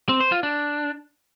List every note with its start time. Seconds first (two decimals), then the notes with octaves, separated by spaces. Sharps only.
0.09 C4
0.20 C5
0.32 F4
0.43 D4